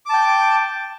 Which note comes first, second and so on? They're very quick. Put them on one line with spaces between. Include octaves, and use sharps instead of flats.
D6 A5 G5